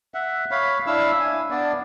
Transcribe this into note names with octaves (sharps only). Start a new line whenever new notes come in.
E5 F#5
C#5 F5 B5
D4 E4 F5 E6
G#5
B3 D4 D5